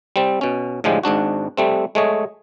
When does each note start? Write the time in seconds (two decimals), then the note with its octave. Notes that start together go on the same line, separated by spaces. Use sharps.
0.16 G3 C4
0.41 B2 C#4
0.84 A2 D3 F3 G#3 G4
1.03 G#1 G#2 D4 F#4
1.57 G3 A3 C4
1.95 G#3 A3 C#5 D#5